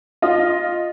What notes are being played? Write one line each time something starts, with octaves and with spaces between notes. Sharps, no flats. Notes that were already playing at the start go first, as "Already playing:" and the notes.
F4 D#5